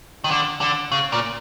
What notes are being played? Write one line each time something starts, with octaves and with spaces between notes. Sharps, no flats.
D#3
D3
D3
C#3
A#2